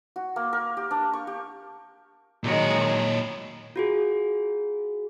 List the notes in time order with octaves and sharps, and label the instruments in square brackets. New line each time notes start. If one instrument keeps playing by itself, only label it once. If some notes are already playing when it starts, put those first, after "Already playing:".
[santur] F#4
A#3
A#4
G4
D4
C#6
G4
[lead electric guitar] A#2 C#5 [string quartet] D#3 F#3 G#3
[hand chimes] F4 F#4 G#4